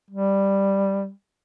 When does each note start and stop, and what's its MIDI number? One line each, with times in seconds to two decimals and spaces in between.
0.10 1.10 55